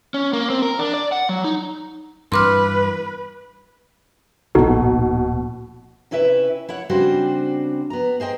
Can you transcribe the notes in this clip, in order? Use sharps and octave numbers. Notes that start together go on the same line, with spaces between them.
C#4
A#3
C4
A#4
D4
D5
F#5
F#3
D#4
G2 E3 B4 C6 D6 F6
D1 A#1 B2 D#4 F#4 A4
C3 C#4 E4 B4 E5
E4 C#5 F#5
C#3 G3 C4 D4 F#4 C5
B3 A#5
G#4 C5 D#5 G5